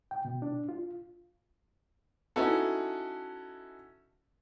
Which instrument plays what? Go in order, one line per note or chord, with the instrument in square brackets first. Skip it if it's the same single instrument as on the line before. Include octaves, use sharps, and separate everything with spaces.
[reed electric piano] G5
B2
D4
F4
[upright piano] C#4 D#4 E4 F#4 A4